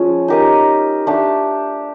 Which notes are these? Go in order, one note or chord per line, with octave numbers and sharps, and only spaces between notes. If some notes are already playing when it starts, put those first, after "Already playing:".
Already playing: F3 G#3 C#4
D#4 G4 A#4 D#5
A3 D4 G4